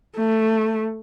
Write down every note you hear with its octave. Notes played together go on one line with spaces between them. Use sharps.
A3